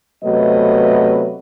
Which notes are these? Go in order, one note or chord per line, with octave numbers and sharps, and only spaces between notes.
C3 F#3 A3 B3 B4 D#5